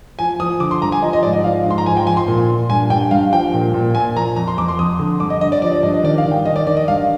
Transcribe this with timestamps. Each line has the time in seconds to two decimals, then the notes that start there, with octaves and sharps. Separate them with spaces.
0.19 F3 G#5
0.40 F3 D#6
0.60 D3 D6
0.71 C6
0.82 G2 A#5
0.92 G#5
1.02 F3 D#5
1.13 D#5
1.23 G#2 D5
1.33 D#5
1.44 F3 F5
1.66 G#2 C6
1.78 A#5
1.86 F3 G#5
1.97 G5
2.07 F3 G#5
2.17 C6
2.28 A#2
2.49 A#2
2.70 G2 G#5
2.90 G2 G5
3.11 G2 F5
3.32 F3 G5
3.54 A#2
3.74 A#2
3.95 A#2 G#5
4.16 F3 A#5
4.36 F2 A#5
4.48 C6
4.58 F2 D6
4.68 C6
4.79 F2 D#6
4.99 D3
5.20 G2 D6
5.30 D#5
5.41 G2 D#5
5.52 D5
5.62 F3 D5
5.72 D5
5.83 G2 D#5
5.94 D#5
6.03 D#3 D5
6.18 F5
6.26 D#3
6.31 G5
6.45 D#3 D#5
6.56 D5
6.67 D#3 D5
6.77 D#5
6.88 G2 F5